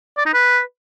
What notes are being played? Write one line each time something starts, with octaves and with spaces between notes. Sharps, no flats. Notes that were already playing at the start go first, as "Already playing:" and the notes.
D5
D#4
B4